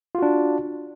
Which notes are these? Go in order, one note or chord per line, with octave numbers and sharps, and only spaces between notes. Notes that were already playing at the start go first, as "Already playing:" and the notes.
D4 F4 F#4